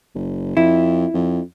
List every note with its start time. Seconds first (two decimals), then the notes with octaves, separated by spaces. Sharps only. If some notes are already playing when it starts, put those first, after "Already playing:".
0.15 F#1
0.57 F2 E4
1.14 F2